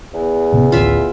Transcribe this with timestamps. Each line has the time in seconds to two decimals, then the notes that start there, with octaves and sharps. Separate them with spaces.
0.14 E2
0.52 A1 C3 B3
0.72 A1 D2 F4 E5